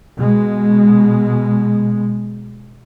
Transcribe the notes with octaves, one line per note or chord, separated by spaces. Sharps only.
B2 G#3